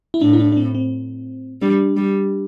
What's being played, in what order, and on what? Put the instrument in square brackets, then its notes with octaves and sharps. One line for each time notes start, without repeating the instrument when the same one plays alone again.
[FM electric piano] E4
[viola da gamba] A2 [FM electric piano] D4
[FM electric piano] E4
D4
D4
C4
C4
[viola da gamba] G3 [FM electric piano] D4
[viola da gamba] G3